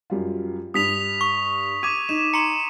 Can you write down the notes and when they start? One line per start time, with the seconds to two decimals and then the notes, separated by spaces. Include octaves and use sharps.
0.10 F#2 G3 F4
0.74 G2 D#6 B6 F7
1.21 C#6
1.83 D6 G#6 D#7
2.09 D#4 E7
2.34 A#5 C6 C#7